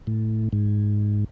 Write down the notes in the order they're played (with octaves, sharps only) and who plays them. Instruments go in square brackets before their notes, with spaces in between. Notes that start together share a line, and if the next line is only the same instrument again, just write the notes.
[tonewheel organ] A2
G#2